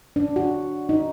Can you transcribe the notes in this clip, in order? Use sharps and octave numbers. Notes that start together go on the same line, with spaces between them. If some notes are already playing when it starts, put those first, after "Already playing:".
D4
F#4
D#4